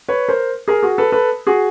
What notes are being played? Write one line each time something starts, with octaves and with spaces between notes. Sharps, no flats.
B4 C#5
A#4 C5
G#4 A#4
F#4 G#4
A4 B4
A4 B4
F#4 G#4